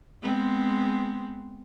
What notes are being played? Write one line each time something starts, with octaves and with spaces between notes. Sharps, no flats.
G#3 B3 C4